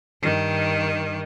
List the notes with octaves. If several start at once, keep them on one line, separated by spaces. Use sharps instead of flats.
G2 D#3